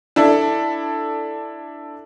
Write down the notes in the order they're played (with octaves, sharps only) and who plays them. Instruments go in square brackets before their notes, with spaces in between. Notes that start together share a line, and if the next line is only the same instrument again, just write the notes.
[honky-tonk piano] D4 E4 A4